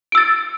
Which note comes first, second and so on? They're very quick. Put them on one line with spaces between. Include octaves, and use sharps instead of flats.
D7 E6 A6